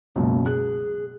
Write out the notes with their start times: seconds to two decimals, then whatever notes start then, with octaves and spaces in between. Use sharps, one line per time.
0.16 C#2 F#2 B2 A#3
0.46 G#4 F#6